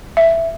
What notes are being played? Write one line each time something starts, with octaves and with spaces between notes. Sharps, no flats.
E5